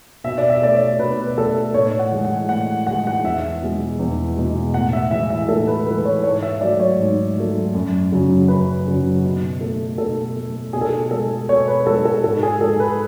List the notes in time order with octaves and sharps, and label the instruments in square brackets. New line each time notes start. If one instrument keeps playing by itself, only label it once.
[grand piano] B2 E5
D5
E5
A3 D5
C#5
B2 B4
B4
A3 A4
A2 C#5
F#5
E3 G#3
F#5
A2 F#5
E3 G#3 F#5
F#5
E2 E5
B2 G#3
E2
B2 G#3
A2 F#5
E5
E3 G#3 E5
E5
A2 A4
B4
E3 G#3 B4
C#5
G#2 C#5
E5
F#3 A3 D5
C#5
G#2
F#3 A3
F#2
C#3 F#3
F#2 B4
C#3 F#3
B2
A3
B2 A4
A3
B2 G#4
A4
G#4
G#3 A4
B2 C#5
B4
G#3 A4
A4
G#2 A4
G#4
G#3 A4
B4